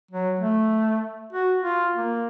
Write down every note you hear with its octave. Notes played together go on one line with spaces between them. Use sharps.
F#3
A3
F#4
F4
A#3